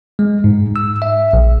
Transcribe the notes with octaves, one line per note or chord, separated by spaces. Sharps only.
G#3
G#2
E6
E5
A#1